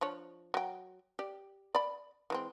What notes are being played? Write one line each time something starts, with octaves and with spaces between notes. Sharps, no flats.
F3 D4 C#5
F#3 G5
G4 D5
D5 B5
E3 G#3 C4